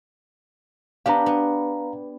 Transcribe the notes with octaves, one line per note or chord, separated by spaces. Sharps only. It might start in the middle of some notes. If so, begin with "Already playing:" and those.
B3 D4 G4 F5 A#5
B3